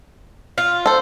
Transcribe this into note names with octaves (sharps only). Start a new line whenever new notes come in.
F4
A4 C5